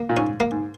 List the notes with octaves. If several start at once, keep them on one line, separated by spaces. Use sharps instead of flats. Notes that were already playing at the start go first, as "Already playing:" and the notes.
Already playing: A#3
A#2
G#2 C#4
A#3
G#2